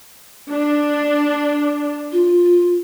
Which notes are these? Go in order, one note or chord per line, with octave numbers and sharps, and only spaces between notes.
D4
F4